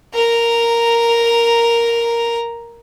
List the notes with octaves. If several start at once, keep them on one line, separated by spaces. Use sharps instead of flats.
A#4 A#5